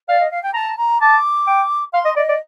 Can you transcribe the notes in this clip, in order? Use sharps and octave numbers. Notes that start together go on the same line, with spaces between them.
D5 F5
D#5
F5
G5
A5 A#5
A#5
A5 D6
G5
F5 C6
D#5
D5 D#5
D5